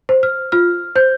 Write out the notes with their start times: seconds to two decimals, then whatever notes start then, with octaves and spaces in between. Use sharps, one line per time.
0.09 C5
0.23 F6
0.52 F4 F6
0.96 C5 G6